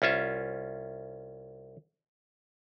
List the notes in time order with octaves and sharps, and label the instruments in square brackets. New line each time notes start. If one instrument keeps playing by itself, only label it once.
[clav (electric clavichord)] C2 C#4 F4 E5